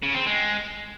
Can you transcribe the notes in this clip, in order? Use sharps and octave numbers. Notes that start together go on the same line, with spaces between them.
C#3
C4
G#3